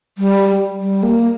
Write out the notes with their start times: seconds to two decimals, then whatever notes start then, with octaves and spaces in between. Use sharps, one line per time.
0.18 G3
0.80 G3
1.03 A#3